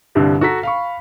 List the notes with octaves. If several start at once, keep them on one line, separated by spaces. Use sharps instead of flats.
C2 G2 D3
F#4 A4 A#5 B6
F5 B5 C#6